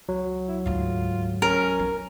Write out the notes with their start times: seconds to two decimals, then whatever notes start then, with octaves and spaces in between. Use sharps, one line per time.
0.08 C#2 F#3
0.48 E4
0.66 D2 G#2 F4
1.42 C#4 A#4
1.79 B3